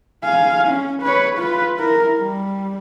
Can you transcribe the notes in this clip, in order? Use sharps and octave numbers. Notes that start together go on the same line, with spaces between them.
F5 G#5
C#4
B4 C#5
F4 B4
E4 A#4
G3